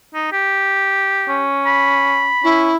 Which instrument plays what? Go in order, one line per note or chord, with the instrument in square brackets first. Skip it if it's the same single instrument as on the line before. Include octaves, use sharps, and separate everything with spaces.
[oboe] D#4
G4
[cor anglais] C#4
[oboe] B5
[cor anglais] C#4 [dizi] E4